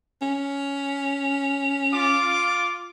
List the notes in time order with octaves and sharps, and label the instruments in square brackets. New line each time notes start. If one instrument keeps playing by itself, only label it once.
[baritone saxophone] C#4
[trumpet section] F4 D6